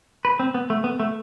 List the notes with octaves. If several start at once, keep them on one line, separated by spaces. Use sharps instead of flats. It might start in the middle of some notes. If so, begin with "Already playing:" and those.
B4
C4
B3
A3
B3
A3